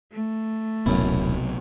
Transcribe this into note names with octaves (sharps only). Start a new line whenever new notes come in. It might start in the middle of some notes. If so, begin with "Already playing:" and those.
A3
D#1 B1 F#2 C3 B3 E4